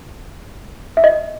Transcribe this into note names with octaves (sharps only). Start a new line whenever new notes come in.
E5
D#5